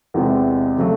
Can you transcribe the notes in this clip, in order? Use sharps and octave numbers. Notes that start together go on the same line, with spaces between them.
E2 C3 E3 G#3
C#3 F#3 A3